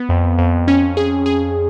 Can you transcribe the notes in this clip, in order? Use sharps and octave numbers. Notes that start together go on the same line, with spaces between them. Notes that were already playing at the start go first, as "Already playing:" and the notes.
Already playing: B3
F2
F2
C#4
G#4
G#4